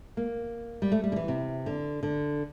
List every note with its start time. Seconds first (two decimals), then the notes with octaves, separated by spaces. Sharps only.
0.17 A#3
0.82 G3
0.92 A3
1.04 G3
1.12 D3
1.16 E3
1.28 C3
1.66 D3
2.03 D3